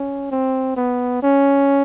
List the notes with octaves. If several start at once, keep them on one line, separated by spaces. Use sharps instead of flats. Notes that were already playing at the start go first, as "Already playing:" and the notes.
Already playing: C#4
C4
B3
C#4